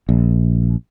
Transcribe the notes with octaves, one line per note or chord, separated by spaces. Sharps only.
A#1